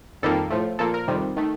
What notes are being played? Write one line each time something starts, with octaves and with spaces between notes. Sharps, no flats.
F2 D#3 G3 A#3 A4
A2 F3 A3
A#2 F3 A#3 A4
A#4
F2 C3 D#3 G3
D#3 A3